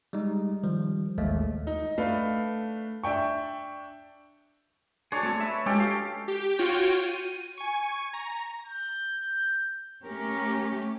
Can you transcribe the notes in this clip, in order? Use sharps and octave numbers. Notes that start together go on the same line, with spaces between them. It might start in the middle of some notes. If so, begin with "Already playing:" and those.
G3 G#3 D#4
D#3 F3 G3
A1 D#2 G#3 A3
D#4
A3 D4 B4 F5
D4 E5 G5 C#6
D4 G#4 C#5
A3 C4
B4 E5
G#3 C#4 G4 A4
F5
G4
F4 F#4 C#5 G5
D#7
G#5 C#6
A#5
G6
A3 C#4 G4 A#4